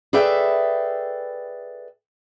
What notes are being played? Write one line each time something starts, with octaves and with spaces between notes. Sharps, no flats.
G#4 A4 B4 D5 E5 G5